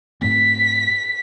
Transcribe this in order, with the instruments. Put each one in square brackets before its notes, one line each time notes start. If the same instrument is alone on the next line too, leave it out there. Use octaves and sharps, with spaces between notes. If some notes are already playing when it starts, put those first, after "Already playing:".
[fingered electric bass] G#2 A3 C4 [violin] B6